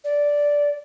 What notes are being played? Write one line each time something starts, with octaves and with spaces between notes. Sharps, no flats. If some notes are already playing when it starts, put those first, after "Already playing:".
D5